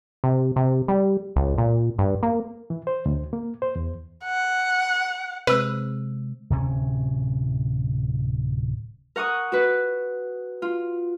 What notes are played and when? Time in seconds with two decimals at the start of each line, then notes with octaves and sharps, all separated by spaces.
0.24 C3
0.56 C3
0.88 G3
1.36 C#2
1.58 A#2
1.98 G2
2.23 A#3
2.70 E3
2.87 C5
3.06 D2
3.33 A#3
3.62 C5
3.76 E2
4.25 F#5
5.47 C3 G#3 B4 C5 E6
6.50 D1 C3 C#4
9.16 A#4 F#5 C#6 D#6
9.52 F#4 B4
10.62 F4